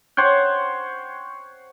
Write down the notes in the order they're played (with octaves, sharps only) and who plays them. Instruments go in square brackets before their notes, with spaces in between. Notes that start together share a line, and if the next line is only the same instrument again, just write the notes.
[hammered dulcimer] C5 C#5 F#5 G5